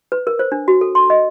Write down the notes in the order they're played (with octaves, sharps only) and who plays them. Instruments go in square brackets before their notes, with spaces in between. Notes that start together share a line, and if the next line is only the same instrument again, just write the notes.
[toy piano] B4
A#4
C5
D4
F#4
A4
C6
D#5